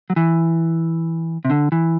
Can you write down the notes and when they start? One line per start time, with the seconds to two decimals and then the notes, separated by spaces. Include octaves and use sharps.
0.10 F#3
0.16 E3
1.45 C3
1.50 D3
1.72 E3